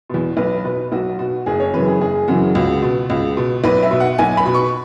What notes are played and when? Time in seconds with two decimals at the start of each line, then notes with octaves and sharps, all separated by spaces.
0.09 E2 B2
0.37 B1 B4
0.65 B2 B4
0.92 B1 F#4
1.18 B2 F#4
1.46 F#1 G#4
1.60 C#5
1.73 F#2 C#3 E3 B4
1.87 G#4
2.01 F#1 G#4
2.28 F#2 C#3 E3 F#4
2.55 C#2 F#4
2.82 B2
3.10 C#2
3.37 B2
3.64 B1 B4
3.83 E5
3.91 B2
4.00 F#5
4.18 B1 G#5
4.37 B5
4.46 B2
4.54 C#6